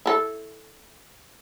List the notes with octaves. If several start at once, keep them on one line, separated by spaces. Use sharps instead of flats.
E4 A4